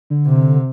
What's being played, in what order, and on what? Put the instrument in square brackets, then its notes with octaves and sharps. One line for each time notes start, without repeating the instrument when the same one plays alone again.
[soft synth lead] D3
[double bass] C3